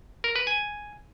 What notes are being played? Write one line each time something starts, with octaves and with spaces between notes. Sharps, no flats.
A#4
B4
G#5